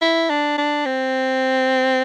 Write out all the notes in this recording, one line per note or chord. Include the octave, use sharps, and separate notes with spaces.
E4
D4
D4
C4